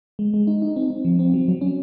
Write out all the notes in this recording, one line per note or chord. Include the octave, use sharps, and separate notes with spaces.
G#3
G#3
D#4
D#4
C4
C4
F3
C4
F#3
F#3
C#4